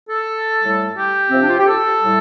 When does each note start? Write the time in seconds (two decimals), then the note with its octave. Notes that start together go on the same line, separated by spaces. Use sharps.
0.09 A4
0.61 A2 G3
0.97 G4
1.30 C3 F3 C4
1.40 D4
1.49 F4
1.59 G4
1.67 A4
2.02 A2 G3